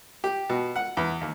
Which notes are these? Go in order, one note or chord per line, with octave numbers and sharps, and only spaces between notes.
G4
B2
F#5
E2
D#2